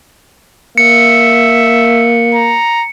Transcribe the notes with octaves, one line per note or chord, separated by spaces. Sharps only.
A#3 E5 C#7
A#5